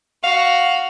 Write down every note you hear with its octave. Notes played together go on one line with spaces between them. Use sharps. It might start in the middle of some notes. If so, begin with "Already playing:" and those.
F#4 F5